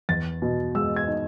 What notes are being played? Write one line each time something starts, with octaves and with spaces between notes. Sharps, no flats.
E2 A6
B2
G#3 E6
G#6
D#4